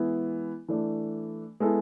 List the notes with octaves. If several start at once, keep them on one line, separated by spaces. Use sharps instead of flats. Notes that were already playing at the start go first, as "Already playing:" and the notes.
Already playing: E3 G#3 B3 E4
E3 A3 D4
G#3 B3 E4 A4